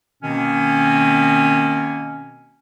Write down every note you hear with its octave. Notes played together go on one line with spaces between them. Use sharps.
B2 D#3 A#3 C4 C#4